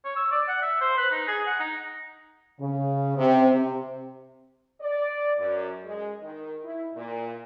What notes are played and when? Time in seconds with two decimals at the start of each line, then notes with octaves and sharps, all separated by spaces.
0.05 C#5
0.16 E6
0.32 D5
0.48 F#5
0.62 E5
0.81 C5
0.97 B4
1.12 D#4
1.27 G#4
1.47 F#5
1.60 D#4
2.59 C#3
3.16 C3
3.51 C3
4.81 D5
5.37 F#2
5.84 G#3
6.22 D#3
6.64 E4
6.95 A#2